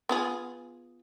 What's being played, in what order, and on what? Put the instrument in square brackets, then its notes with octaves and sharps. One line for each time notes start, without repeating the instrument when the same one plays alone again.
[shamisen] B3 F4 G#4